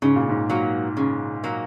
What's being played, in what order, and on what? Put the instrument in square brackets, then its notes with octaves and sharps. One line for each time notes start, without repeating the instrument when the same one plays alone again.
[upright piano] G#2 [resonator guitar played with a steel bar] C#3
[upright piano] A#2
G#2
[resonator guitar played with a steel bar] F#3 A#3
C#3
F#3 A#3